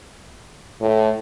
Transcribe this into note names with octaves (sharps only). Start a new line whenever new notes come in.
A2